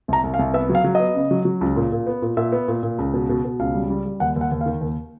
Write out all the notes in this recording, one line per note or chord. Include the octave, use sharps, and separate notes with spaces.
C2 A#5
C2
F5
C2
B3 E5
F#3
F5
F#3
B3 D#5
C#3
F#3
F#3
C#2
A#2
A#2
B3
A#2
A#2 E5
B3
A#2
A#2
C#2
B2
B2
B2
C#2 F5
G3
G3
G3
D#2 F#5
D#2
F#5
D#2
F5
D#3
D#2